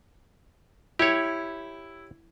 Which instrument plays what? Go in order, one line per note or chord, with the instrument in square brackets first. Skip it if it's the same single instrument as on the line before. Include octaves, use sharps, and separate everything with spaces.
[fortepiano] E4 [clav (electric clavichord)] G4 C#5